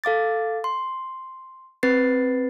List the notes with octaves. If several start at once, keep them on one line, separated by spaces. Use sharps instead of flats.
A4 F5 D6 A6
C6
C4 B4 A6 C7